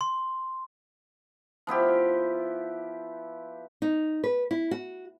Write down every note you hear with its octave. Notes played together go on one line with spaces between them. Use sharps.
C6
F3 B3 E4 G4
D#4
B4
E4
F#4